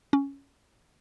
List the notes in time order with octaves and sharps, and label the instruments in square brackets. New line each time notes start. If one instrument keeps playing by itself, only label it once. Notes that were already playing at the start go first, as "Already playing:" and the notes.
[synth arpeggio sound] C#4